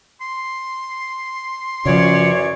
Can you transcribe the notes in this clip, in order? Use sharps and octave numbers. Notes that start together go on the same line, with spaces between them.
C6
F#2 C#3 E3 F3 C#5 D5